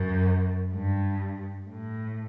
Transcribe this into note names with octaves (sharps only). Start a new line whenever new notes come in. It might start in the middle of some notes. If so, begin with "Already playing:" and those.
Already playing: F#2
G2
A2